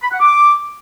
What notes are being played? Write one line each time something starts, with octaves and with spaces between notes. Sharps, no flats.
B5
F#5
D6